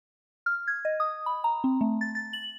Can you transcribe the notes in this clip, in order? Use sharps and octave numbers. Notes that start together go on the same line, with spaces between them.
F6
G#6
D#5
D#6
B5
A#5
C4
A3
A6
A6
F#7